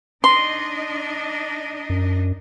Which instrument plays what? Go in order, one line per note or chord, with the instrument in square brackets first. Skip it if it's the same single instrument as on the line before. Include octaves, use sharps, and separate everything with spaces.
[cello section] D4 D#4 D#5 [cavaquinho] C6
[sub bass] F#2